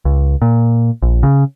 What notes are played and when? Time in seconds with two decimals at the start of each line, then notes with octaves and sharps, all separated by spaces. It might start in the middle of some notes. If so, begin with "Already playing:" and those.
0.05 C#2
0.42 A#2
1.02 A#1
1.23 C#3